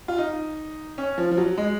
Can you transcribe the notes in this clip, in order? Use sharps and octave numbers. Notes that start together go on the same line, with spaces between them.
F4
D#4
C#4
F3
F3
F#3
G#3